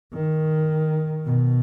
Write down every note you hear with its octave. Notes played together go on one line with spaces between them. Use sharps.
D#3
B2